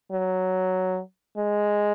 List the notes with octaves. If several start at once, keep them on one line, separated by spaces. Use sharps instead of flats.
F#3
G#3